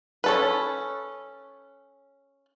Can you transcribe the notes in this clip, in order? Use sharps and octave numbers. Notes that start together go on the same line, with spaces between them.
C#4 A4 B4